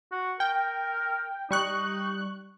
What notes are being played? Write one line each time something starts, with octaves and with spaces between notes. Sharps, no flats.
F#4
A#4 G5
G3 D#4 C#6 F#6